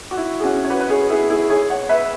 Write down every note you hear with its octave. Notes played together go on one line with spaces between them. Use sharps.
F#4
E4
G#4
C#4 F#4
C#5
F#4 B4
B4
G#4 C#5
E4 G#4
E4 G#4
G#4 C#5
C#5 F#5
B4 E5